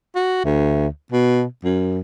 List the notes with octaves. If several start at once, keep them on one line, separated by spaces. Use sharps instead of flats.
F#4
D2
B2
F#2